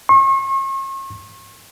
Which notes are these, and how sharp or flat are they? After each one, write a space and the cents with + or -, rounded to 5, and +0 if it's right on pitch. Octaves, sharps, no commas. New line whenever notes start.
C#6 -40